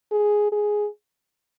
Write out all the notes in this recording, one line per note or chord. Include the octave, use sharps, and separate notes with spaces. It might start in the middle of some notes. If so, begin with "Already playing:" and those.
G#4
G#4